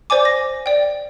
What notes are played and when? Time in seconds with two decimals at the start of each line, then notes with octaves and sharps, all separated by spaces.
0.10 C5 D5 G#5 D6
0.25 A#6
0.66 D5 G5